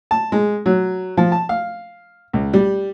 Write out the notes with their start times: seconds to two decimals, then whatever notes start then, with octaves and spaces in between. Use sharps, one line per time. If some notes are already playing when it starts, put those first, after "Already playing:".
0.11 A5
0.32 G#3
0.66 F#3
1.17 F3
1.32 A5
1.49 F5
2.33 C#2
2.53 G3